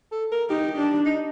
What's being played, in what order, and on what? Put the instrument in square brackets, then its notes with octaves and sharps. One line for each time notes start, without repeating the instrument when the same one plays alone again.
[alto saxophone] A4
A#4
[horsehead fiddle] D#4 [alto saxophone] G4
[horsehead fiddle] D4
[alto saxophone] D#4